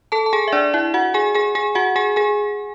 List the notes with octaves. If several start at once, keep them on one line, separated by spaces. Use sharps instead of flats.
A4 A5
A5
G#4 G#5
E5
D4 D5
E4 E5
F#4 F#5
G#4 G#5
G#4 G#5
G#4 G#5
F#4 F#5
G#4 G#5
G#4 G#5